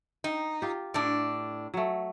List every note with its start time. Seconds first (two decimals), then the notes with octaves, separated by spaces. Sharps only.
0.24 D#4 G5
0.62 F4 G4
0.94 A2 D4
1.74 F#3 A3